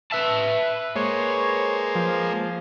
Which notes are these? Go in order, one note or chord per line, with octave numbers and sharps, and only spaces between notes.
B4 E5 A5
G#3 A#3 C5 C#5
F3